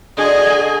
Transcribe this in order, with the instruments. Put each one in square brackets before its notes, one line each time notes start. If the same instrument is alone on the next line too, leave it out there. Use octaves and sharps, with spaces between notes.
[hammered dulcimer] D3 F#4 C6 [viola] G#4 G#5 [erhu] D#5